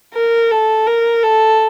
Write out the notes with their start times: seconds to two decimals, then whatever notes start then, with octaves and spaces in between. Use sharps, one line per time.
0.14 A#4
0.51 A4
0.87 A#4
1.23 A4